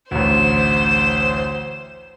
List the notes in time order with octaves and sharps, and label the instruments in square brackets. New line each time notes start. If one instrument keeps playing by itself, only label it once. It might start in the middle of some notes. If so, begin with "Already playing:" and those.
[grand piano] A1 D2 [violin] C5 E7